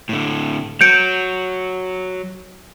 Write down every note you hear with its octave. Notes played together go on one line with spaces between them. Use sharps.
A2 D3
F#3 G6 C#7 D7